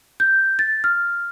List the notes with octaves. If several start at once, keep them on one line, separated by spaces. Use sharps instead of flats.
G6
A6
F6